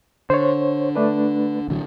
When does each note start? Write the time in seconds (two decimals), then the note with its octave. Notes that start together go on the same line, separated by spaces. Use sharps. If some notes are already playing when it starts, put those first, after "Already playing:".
0.30 D3 C5 C#5
0.95 A3 D4 B4
1.68 A1 D3 F#3